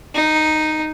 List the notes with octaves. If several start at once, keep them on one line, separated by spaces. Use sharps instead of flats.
D#4